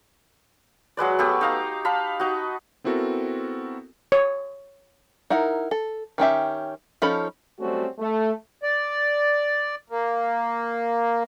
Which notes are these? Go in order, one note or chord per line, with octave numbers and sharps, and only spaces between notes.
F#3 G#3 B4 D5
A3 B3 G4
D#4 F5 A#5
F5 A5 B5
D#4 F#4
B3 C4 E4 F#4 A4 A#4
C#5
D#4 E4 A#4 F#5
A4
D#3 C#4 G4 E5
F3 C#4 D#4 A4 B5
F#3 G3 A3 C4 C#4 F#4
A3
D5
A#3